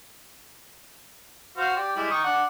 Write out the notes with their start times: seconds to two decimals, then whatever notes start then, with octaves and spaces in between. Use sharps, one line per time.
1.57 F#4 C5 F5
1.76 G4 D5
1.96 G3 G#3 E4
2.10 D#3 C#6 D#6
2.24 D4 F#5